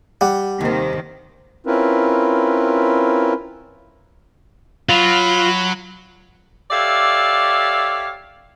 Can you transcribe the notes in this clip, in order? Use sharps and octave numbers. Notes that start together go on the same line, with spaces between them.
G3 F#5
D#2 C3 D#3 A#3 C5
C4 C#4 E4 F4 A#4 B4
F#3 F4 B5
G4 A4 C#5 D5 E5 F5